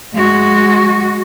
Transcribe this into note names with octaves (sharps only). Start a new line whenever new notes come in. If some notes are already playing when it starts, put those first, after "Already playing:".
G#3 F#4